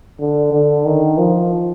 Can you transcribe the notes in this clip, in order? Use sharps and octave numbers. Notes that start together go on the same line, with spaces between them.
D3
D3
D#3
F3